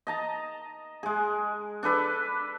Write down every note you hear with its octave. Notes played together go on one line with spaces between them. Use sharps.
D#5 A5 A#5
G#3 G#4
D4 A4 B4 D5